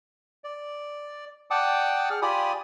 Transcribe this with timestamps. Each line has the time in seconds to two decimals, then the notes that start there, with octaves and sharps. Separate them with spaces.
0.44 D5
1.50 D5 F#5 G5 A5 D6 D#6
2.10 G#4 F6
2.22 F4 G4 D5 G#5 B5 D#6